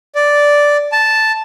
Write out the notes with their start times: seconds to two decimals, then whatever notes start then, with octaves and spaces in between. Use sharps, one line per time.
0.15 D5
0.92 A5